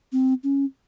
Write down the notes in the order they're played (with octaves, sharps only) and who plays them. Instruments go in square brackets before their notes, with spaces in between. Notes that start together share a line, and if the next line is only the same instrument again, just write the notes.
[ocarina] C4
C#4